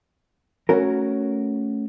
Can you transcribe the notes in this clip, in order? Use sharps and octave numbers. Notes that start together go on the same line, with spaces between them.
A3 C#4 F#4 A#4